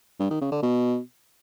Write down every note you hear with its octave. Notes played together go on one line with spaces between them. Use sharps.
G2
D#3
C#3
D3
B2